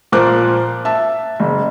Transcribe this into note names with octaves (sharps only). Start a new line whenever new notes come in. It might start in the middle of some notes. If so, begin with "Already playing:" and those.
A#2 F3 A#4 C5 D6 F#6
E5 A5
F#1